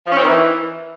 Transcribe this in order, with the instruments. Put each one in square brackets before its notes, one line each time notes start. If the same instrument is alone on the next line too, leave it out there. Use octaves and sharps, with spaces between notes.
[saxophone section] F3
C#4
C4
D#3
E3